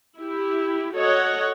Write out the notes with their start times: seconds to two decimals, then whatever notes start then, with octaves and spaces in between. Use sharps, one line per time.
0.17 E4 G4
0.95 F#4 A4 C#5 D#5 F#5